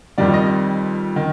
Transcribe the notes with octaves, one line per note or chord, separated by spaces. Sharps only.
F2 D#3 G3 D5
D#5
D#3